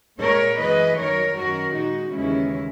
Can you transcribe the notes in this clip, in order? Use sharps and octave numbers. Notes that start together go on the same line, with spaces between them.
A#2 G#3 A#4 C#5
F#2 E3 G#3 B4 D#5
F#2 D#3 F#3 A#4 C#5
F#2 D#3 F#3 F#4 A#4
A#2 G#3 D#4 F#4
D#2 C#3 E3 G#3 C#4 E4